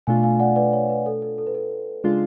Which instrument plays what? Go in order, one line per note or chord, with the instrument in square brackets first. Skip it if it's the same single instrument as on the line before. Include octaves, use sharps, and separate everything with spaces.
[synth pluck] B2 A3 D4 F4 [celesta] F5 G#5
[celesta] F5 G#5
D5 F#5
B4 D5
C#5
B4
A4
A4
A4
B4
A4
[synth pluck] C#3 G#3 D4 F4 [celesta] G#4